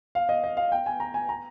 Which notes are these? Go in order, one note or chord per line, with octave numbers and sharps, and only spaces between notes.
F5
D#5
D#5
F5
G5
G#5
A#5
G#5
A#5